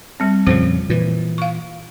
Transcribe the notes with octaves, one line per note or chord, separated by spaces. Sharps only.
G3 C4
F2 A#2 C#3 F4 C5
A#2 E3
F5 C#6